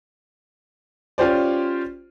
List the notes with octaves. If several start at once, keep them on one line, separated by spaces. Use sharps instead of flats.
C#4 F4 G4 C5 D5